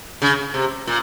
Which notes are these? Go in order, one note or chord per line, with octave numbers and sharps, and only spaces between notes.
C#3
C3
A#2